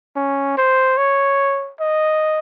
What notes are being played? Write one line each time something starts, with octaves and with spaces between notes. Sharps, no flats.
C#4
C5
C#5
D#5